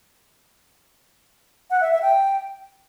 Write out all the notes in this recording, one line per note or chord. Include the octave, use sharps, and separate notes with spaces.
F#5
E5
E5
G5